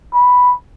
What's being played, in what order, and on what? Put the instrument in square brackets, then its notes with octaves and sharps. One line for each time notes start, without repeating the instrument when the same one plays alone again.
[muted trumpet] B5